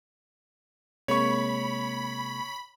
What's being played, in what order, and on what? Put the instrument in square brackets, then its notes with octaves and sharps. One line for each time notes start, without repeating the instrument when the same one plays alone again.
[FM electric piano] C3 G#3 A#3 [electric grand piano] C#5 C#6 [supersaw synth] B5